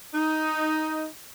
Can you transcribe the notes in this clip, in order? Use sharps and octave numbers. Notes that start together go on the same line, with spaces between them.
D#4